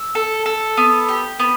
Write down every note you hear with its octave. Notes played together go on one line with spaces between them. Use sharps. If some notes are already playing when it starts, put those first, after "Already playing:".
Already playing: E6
A4
A4
B3
G4
B3